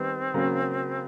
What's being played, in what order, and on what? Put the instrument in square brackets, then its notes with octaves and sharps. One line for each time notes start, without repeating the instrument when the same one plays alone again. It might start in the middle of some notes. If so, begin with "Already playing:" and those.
Already playing: [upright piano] D#3 G3 B3 [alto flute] C4
[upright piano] C#3 F#3 A#3 C#4